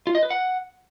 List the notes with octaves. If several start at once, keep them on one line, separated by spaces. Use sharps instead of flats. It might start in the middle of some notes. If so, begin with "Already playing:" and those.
F4
D#5
B4
F#5